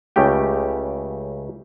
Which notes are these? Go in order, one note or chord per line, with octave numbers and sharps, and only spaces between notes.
C#2 C#3 A3 G4 G5